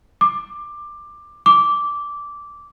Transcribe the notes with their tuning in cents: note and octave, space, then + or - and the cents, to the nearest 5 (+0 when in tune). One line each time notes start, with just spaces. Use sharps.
D6 +15
D6 -10